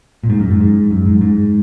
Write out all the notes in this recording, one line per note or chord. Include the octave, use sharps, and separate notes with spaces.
A#2
G#2
F#2
G#2
G#2
F#2
G#2
G#2